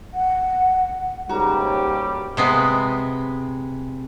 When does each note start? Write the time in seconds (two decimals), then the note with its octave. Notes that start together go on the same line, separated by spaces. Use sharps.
0.14 F#5
1.29 C#2 G#2 G3 A#3 C#4 F#4 G4 A#5
2.37 C3 G#3 B3